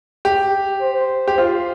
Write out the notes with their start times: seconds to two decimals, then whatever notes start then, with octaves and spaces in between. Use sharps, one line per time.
0.25 G4
0.81 C5
1.28 G4
1.38 F4 C5